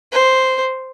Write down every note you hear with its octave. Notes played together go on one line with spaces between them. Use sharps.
C5